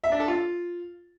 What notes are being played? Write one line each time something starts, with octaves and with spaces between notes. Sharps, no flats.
E5
D4
A4
F4